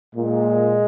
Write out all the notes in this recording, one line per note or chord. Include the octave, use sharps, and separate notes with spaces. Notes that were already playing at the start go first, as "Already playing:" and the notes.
A#2 G#3